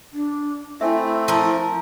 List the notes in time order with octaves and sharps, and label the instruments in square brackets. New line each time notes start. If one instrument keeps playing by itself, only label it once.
[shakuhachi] D4
[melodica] A3 C4 [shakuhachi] E4 [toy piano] E5 G#5
[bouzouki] F3 A#4 [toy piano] C6